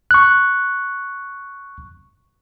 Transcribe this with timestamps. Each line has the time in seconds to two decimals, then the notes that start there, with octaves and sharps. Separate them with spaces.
0.11 C#6 F#6